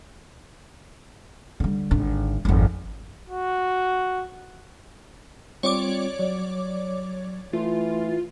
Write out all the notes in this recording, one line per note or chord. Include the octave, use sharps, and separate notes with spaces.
D3 G3
G#1 D3
G#1 F2
F#4
G3 C4 F4 C#5 D5 D6
F#3
E3 A3 F4